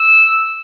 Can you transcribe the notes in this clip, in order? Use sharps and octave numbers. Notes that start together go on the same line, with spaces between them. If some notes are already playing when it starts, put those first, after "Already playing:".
Already playing: E6